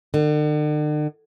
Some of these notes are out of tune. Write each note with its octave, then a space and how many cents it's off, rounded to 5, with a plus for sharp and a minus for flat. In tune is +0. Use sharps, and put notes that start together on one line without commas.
D3 +45